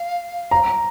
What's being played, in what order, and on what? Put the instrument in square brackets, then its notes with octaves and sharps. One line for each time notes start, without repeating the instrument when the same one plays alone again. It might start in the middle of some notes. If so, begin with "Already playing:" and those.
Already playing: [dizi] F5
[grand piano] A#5